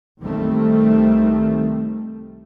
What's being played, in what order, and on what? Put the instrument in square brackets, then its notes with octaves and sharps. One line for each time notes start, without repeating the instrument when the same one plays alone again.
[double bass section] C2 D#3 G3 A3 C4